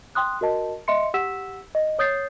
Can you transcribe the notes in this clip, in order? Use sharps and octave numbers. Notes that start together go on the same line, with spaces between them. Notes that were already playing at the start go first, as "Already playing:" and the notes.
G5 C6 D#6 F#6
F#4 A#4 D#5 A5
D#5 E5 C6 C#7
G4 F#5 E6 B6 E7
D#5
C#5 D#6 G6 A6 C7